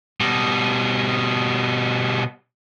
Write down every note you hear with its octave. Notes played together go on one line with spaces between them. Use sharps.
B2 G3